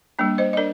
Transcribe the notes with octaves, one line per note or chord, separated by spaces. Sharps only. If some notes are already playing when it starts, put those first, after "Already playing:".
G3 A#3 D4
C5 D#5
D#5
D4 A#4 D5